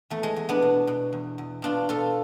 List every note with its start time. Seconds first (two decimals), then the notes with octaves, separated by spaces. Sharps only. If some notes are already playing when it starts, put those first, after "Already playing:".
0.10 E2 A3
0.23 G#3
0.36 E2
0.49 B3 D4
0.62 B2
0.87 B2
1.13 E2
1.38 E2
1.62 B2 D4 F4
1.89 B2 F4 A4